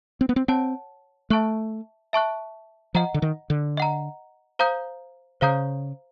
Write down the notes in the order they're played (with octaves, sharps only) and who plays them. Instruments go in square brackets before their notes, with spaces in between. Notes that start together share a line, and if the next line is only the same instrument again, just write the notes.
[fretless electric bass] C4
B3
C4
[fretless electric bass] C4 [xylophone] C#5 F#5 A5
[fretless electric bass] A3 [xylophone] E5 A5 C#6 F#6
[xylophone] E5 A5 C#6 F#6
[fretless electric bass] F3 [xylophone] D#5 F#5 A#5
[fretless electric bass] D3
D#3
D3
[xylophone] D#5 F#5 A#5
C5 F5 A#5 D#6 G6
[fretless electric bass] C#3 [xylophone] C5 F5 A#5 D#6 G6